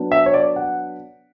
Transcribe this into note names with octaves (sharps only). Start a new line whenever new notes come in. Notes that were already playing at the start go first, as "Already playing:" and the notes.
Already playing: F#3 B3 D4
E5
C#5
D5
F#5